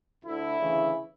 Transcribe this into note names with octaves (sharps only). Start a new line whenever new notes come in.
D2 D3 E4
D2 C#3 E3